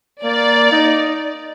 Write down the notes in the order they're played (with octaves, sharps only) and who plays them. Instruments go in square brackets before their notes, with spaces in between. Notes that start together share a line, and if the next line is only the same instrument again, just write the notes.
[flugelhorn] A#3 [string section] D5
[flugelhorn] D#4